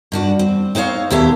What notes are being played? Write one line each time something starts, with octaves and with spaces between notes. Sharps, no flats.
G2 D4 F#4
C4
C4 D#4 C5 C#5 F5
D#2 B2 G4 A4 C5 E5